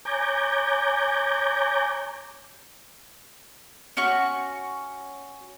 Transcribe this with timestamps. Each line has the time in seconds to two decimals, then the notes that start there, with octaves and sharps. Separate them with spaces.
0.05 C#5 G#5 A#5 D6 G6
3.97 C#4 F#4 C#6